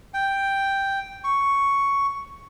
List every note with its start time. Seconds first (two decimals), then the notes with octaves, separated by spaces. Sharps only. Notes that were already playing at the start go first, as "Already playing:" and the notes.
0.14 G5
1.24 C#6